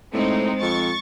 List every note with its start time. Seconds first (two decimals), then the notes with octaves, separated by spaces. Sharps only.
0.13 A2 G#3 C4 D#4
0.62 F2 C#6 A6